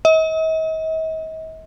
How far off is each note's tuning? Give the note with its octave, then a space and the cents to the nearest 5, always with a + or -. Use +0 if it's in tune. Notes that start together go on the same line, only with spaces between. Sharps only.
D#5 +45